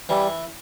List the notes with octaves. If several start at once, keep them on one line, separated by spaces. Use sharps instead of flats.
E3 G3